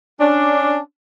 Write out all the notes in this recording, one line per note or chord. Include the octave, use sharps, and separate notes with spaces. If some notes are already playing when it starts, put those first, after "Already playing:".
C#4 D4